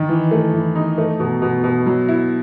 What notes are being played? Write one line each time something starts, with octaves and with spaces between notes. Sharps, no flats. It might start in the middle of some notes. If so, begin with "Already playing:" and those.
Already playing: D#3
E3
A3
E3
D#4
A3
B2
B2
B2
F#3
E4